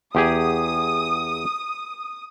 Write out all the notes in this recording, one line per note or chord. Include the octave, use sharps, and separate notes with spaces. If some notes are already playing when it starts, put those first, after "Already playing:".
E2 G4 G#4 D#6